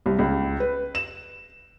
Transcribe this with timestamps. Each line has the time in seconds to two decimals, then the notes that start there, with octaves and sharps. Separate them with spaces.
0.06 C2
0.19 C#2
0.60 B4
0.95 E7